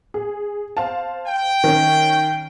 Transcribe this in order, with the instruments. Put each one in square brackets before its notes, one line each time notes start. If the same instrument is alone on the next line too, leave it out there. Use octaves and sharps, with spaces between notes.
[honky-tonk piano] G#4
C5 F5 A5
[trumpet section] G5
[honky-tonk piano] D#3 C#4